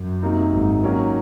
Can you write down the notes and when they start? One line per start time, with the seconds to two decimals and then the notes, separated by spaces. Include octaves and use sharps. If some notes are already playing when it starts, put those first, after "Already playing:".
Already playing: F#2
0.22 C3 F#3 A#3 D#4
0.52 G#1 G#2
0.83 D#3 F#3 A#3 C#4 F#4